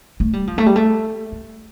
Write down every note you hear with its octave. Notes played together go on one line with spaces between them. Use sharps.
A3
G3
F3
A3
G3
A3
A3